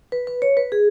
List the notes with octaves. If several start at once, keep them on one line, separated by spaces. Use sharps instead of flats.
B4
B4
C#5
B4
G#4